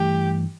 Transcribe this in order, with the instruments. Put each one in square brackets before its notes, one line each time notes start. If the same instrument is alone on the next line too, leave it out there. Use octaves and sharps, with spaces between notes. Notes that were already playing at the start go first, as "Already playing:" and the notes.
Already playing: [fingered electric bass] G2 E3 A3 [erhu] G4